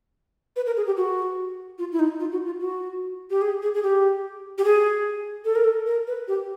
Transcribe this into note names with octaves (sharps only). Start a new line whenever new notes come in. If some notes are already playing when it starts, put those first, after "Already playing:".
B4
A#4
G#4
G4
F#4
F4
E4
D#4
F4
F#4
F4
F#4
G4
G#4
G#4
G#4
G4
G4
G#4
A4
A#4
A4
A#4
B4
G4